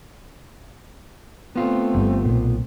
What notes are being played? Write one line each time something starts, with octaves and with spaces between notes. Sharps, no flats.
A3 B3 C4 F4
G1 G2
B1 A#2